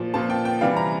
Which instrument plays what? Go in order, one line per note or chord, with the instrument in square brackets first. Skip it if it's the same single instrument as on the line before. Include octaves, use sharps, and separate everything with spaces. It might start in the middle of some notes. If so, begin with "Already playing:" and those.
Already playing: [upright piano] A#2 F3
A#2 F3 A5
G5
G5
C3 E3 G3 F5
A#5